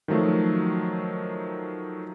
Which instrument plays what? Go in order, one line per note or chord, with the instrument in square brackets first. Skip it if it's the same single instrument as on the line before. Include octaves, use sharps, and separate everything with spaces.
[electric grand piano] D#3 F3 F#3 A3